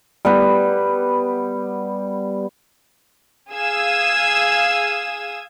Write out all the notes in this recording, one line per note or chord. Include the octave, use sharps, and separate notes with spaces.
G3 B3 B4
G#4 F5 D#6 E6 G#6